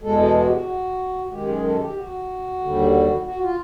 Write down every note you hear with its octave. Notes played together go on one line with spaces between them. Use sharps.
E2 B2 G#3 A4
A4
F#4
G4
F#4
F#2 D#3 G#3 G4
G#4
A4
G4
F#4
D#2 D3 G3
F#4
F4